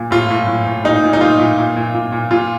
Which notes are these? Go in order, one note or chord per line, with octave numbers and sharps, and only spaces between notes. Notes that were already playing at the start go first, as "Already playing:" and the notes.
Already playing: A#2
A2 F4
A2
A2
A2
A#2 D#4
A#2
D#4
A#2 F4
A#2
A#2
A#2
A#2
A#2
A#2 F4